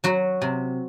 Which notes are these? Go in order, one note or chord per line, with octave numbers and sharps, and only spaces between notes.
F#3 F#4
C3